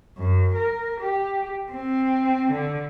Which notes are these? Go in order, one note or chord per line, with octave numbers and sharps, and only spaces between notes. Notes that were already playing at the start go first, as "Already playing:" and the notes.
F#2
A#4
G4
C4
D3